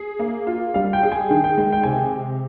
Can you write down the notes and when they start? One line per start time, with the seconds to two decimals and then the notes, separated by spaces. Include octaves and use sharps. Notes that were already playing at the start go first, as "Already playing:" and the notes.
Already playing: G#4
0.19 A#3
0.47 F4
0.74 G3 F5
0.93 G5
1.03 G#4
1.12 G#5
1.30 D#3 G5
1.44 G5
1.57 G#3 G5
1.73 G5
1.83 C3 G#5